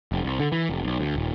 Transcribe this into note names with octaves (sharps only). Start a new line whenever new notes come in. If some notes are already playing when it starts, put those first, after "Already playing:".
F1
C2
D3
E3
F1
B1
D2
D#1